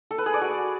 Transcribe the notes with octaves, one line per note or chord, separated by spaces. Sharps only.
A4
B4
G#4
D5
F#4